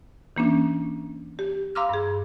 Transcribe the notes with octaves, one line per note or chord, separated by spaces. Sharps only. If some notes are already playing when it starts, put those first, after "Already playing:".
E3 A#3 C#4 D4
G4
F5 A#5 C6 D6 E6 F6
G2 G#4